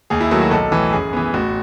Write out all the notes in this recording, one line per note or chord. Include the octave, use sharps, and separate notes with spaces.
D#2 G#4
E4
D#3 F#3 A3
F#4
B1 A4
A2 E3
F#2 G#4
E3 B3
A1 F#4